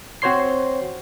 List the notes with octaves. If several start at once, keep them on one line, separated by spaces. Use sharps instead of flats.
C4 F#4 C5 C#5 C6 C7